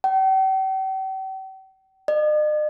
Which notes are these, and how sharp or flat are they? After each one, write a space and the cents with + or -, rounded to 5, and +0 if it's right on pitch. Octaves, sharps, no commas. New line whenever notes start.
G5 -45
D#5 -45